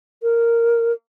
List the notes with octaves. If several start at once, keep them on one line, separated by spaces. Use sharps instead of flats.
A#4